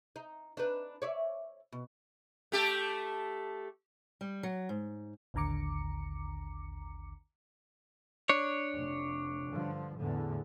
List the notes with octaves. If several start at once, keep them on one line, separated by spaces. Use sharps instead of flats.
D#4
D4 D#4 B4
C#5 D5 E5
B2
A3 G4 A4
G3
F#3
G#2
A1 D#2 D3 A#5 D6 C#7
D4 C#5
F1
G2 D3 F3
E2 A2 D3